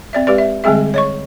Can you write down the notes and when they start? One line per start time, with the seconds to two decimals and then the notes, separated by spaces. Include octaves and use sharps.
0.13 C4 D5 E5
0.27 G#3 G4 B4 D5
0.38 E5
0.64 D3 G3 G#3 C4 G#4 E5
0.94 C#5 D#5 C#6